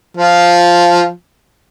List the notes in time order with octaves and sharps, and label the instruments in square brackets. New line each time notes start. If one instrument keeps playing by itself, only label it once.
[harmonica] F3 F4